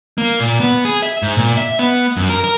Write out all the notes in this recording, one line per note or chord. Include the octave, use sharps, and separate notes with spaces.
A#3
A#2
B3
G#4
E5
G#2
A#2
E5
B3
F#2
A#4
A#4